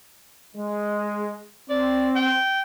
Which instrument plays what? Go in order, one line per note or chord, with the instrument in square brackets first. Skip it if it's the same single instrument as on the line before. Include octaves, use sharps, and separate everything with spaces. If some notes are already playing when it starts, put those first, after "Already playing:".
[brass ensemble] G#3
[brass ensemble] C4 [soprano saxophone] D5
[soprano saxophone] G5